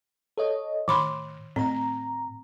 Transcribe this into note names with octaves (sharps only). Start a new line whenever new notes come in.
A4 C#5 D#5
A2 D#3 B5 C6
A2 C4 A#5